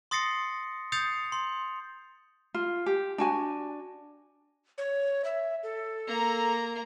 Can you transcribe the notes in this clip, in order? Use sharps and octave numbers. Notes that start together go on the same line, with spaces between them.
C6 D#6 A6 A#6 C7 C#7
D#6 G6 A6 C7 C#7 F7
C6
F4
G4
D4 F#4 G#5
C#5
E5
A4
A#3 A#5